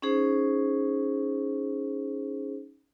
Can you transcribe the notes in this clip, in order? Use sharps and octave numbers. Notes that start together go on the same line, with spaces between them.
C#4 D#4 G#4 C5